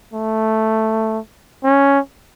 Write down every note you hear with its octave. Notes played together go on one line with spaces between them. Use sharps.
A3
C#4